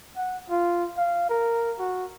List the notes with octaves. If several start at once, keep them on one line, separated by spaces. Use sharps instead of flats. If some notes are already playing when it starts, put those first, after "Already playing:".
F#5
F4
F5
A#4
F#4